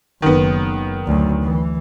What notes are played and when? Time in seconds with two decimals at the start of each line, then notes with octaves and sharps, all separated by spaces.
0.22 F#1 D#3 B3
1.06 D2 F#3
1.43 E3